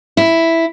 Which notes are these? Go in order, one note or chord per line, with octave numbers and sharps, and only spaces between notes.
E4